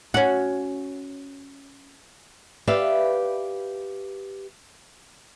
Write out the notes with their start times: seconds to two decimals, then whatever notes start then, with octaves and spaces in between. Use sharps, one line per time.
0.14 C#4 F#4
2.67 G4 B4 D5 E5 F5